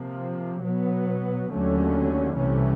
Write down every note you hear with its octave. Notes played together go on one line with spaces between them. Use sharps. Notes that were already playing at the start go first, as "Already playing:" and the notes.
Already playing: C3 F3 A#3
B2 F#3 B3
D#2 D3 F#3 A3 C#4
C2 C3 E3 A3 C#4